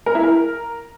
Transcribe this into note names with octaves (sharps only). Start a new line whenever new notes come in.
A#4
E4
A#4